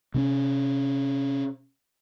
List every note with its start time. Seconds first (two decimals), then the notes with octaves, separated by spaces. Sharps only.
0.14 C3 C4 C#4